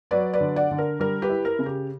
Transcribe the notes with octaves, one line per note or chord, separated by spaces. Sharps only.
F#3 B4 D5
B4 D5
D3
D5 F#5
D3
A#4
G3 A#4
G4 B4
E4
A#4
C#3
G4